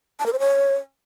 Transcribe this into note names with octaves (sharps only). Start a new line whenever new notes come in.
A5
A#4
C5
C#5